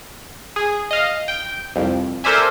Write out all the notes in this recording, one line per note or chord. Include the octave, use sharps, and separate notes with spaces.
G#4
D#5 F5
G5
C2 F2
A4 A#4 C5 D5 E5 G#5